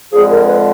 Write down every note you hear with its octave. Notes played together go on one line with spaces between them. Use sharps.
F2 D3 F3 G#3 G#4
A#4
B4